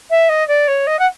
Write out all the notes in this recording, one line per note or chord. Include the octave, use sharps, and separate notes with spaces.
E5
D#5
D5
C#5
D#5
F#5